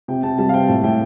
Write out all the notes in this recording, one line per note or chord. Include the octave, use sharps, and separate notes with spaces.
C3 G5
C3 A5
G3 A5
F5
C4 G5
A2 A5
A2 G5